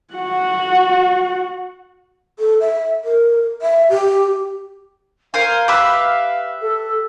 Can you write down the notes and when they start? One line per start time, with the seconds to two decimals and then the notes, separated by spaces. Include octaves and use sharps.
0.14 F#4 F#5
2.39 A4
2.61 E5
3.04 A#4
3.62 E5
3.90 G4
5.34 A#4 C5 F5 G#5
5.68 G4 B4 E5
6.62 A4